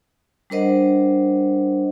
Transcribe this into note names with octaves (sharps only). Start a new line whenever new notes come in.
G3 D4 A#4 C5 D#5 F#5